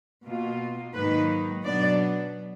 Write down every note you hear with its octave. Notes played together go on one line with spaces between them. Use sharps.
B2 A#3 F4
G#2 D#3 F#3 A#3 D#4 B4
B2 F#3 B3 D4 D5